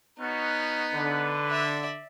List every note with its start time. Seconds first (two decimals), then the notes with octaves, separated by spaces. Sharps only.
0.20 B3 C#4 D#4 F#4
0.94 D3 B4
1.49 D5 E5